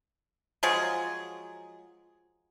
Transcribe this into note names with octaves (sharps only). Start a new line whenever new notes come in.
F3 F#3 G#3 G#4